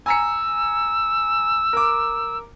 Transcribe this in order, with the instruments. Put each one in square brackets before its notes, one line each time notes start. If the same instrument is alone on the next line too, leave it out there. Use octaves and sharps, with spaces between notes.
[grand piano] G#5 A#5 C#7 [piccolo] E6
[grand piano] A#4 D6